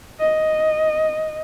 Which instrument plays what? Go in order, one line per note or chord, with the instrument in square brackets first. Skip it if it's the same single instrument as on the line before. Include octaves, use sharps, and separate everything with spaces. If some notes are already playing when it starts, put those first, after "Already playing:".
[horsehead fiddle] D#5